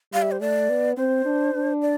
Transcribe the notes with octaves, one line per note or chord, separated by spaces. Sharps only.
G3 F5
E5
C5
A3 D5
B3
C4 C5
D4
D4
D5